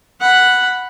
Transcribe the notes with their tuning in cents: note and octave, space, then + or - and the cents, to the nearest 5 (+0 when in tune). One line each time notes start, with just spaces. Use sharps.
F#5 +0 B5 +0